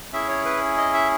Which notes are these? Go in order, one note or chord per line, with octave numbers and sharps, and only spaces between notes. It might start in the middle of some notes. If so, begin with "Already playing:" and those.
C#4 E4 G#4 E5
C#5
B4
D#5
E5